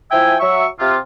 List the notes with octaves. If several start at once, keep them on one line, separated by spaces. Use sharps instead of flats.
F3 E4 E5 G5 G#5
F#3 E5 C#6
C3 F4